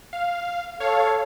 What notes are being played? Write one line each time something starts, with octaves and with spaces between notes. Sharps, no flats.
F5
A4 C#5 F5